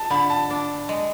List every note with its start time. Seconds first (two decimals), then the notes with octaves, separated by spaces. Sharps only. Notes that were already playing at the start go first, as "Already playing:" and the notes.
Already playing: A5
0.10 D3 B5
0.30 A5
0.50 D4
0.89 G#3